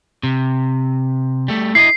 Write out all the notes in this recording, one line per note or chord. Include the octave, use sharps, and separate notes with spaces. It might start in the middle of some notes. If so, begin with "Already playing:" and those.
C3
G3 A3
E4 D5 D#5 C7